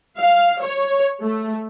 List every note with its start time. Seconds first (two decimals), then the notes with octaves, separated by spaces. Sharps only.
0.18 F5
0.61 C#5
1.22 A3